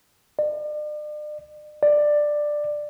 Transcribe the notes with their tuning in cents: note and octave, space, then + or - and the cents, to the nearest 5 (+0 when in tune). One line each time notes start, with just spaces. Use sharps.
D5 +40
D5 +10